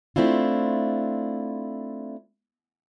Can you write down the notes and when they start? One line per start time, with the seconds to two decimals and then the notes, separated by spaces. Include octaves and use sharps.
0.16 A3 C4 D4 E4 F4